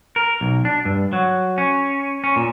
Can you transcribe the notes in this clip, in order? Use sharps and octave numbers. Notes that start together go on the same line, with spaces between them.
A#4
B1
D4
G2
F#3
C#4
C#4
A#2